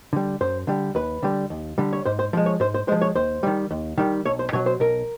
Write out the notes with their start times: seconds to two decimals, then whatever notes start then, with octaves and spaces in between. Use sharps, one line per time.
0.13 D3 G3
0.41 F#2 C5
0.67 D3 G3
0.95 D#2 B4
1.23 D3 G3
1.50 D#2
1.78 D3 G3
1.93 C#5
2.05 G#2 C5
2.19 C5
2.33 F3 G#3
2.46 C#5
2.60 G#2 C5
2.74 C5
2.88 F3 G#3 C5
3.01 C#5
3.15 D#2 C5
3.43 D#3 G3
3.71 D#2
3.98 D#3 G3
4.25 B1 C#5
4.39 C5
4.53 B2 F#3 C#5
4.66 C5
4.80 B1 A#4